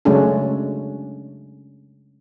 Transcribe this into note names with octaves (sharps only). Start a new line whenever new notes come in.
C#3 F#3 G#3 A3 C#4 D4